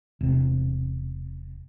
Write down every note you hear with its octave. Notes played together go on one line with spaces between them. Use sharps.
E1 C3